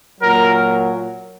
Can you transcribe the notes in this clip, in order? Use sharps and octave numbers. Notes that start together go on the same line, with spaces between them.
A#2 F#3 A#4